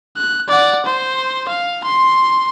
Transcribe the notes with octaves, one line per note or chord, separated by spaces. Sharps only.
F#6
D5 F#5
C5
F5
C6